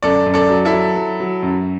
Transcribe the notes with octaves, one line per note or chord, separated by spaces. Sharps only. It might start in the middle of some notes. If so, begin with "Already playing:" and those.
F#2 A4 D5
F#2
A4 D5
F#3
E4 A4
F#3
F#3
F#3
F#2